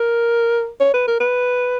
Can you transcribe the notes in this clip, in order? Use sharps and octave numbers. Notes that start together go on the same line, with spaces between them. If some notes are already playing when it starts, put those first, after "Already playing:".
Already playing: A#4
C#5
B4
A#4
B4